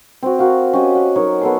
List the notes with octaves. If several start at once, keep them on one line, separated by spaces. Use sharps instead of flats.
C4 F#4
F#4 A#4 F5
C#4 G4 D#5
F#5
F#3 D#4 A#4 C#5
B3 A4 C6